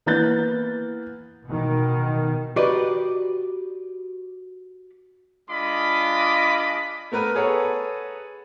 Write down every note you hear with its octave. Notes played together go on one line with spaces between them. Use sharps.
E3 A#3 B3 F#6 G6 A6
B2 D#3
F#4 G4 A#4 B4 D5 D#5
G#3 D4 F4 D#5 B5 D6
A3 B3 A#4 B4
G#4 A4 B4 C#5 F#5 A#5